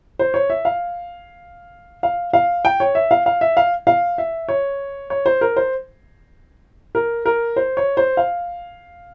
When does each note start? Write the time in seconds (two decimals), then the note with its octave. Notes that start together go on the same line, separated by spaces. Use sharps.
0.19 C5
0.34 C#5
0.50 E5
0.65 F5
2.03 F5
2.33 F5
2.65 G5
2.80 C#5
2.95 E5
3.11 F5
3.26 F5
3.41 E5
3.57 F5
3.87 F5
4.18 E5
4.48 C#5
5.10 C#5
5.26 C5
5.41 A#4
5.56 C5
6.95 A#4
7.26 A#4
7.56 C5
7.77 C#5
7.97 C5
8.17 F5